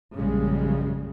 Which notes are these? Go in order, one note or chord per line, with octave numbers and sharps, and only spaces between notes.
A#1 F#2 C#3 G3 G#3